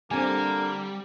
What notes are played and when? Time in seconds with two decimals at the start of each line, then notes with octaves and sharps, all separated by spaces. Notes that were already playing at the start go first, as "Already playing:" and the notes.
0.11 D3 G3 A#3 C4 G#5